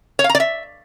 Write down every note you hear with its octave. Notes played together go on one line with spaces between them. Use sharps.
C#5
F5
A#5
D5
E5